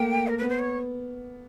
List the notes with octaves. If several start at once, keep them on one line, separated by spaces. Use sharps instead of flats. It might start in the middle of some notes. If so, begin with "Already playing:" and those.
Already playing: A3 A#3 G5
A#4
B3 B4
C5
C#5